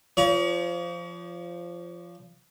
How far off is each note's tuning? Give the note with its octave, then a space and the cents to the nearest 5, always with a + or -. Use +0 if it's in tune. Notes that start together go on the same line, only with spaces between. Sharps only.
F3 -10 C#5 +35 A#5 +45